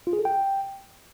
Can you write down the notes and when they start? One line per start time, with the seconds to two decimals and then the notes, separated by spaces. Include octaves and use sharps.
0.07 F4
0.13 G#4
0.19 A4
0.25 G5